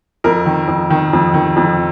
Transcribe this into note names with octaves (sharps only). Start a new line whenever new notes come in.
F2 A#4
D#3
F2
D#3
F2
D#3
F2